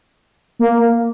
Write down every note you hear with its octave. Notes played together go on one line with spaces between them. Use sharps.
A#3